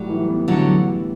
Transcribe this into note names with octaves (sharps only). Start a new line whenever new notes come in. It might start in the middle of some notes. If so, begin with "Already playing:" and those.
Already playing: A2 F#3 G3
E3
B3
A2 D3 F#3